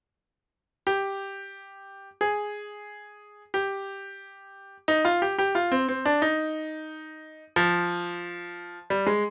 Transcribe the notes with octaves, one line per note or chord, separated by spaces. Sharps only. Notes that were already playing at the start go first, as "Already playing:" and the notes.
G4
G#4
G4
D#4
F4
G4
G4
F4
C4
C4
D4
D#4
F3
G3
G#3